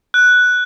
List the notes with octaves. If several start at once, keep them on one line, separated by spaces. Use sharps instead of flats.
F#6